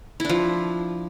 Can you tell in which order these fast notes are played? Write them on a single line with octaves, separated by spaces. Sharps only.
E4 D4 F3